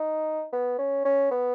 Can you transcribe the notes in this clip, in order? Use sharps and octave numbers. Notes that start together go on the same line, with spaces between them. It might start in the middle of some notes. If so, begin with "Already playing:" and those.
Already playing: D#4
B3
C#4
C#4
B3